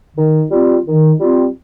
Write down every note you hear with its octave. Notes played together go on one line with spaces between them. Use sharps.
D#3
G3 C4 F4
D#3
G3 C4 F4